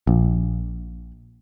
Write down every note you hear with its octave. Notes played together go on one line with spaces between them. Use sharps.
A#1